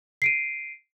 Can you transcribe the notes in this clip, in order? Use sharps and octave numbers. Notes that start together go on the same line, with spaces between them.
C7 D7 D#7